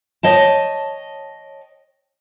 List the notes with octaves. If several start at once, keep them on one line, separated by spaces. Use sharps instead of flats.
C#5 D#5 G5 A5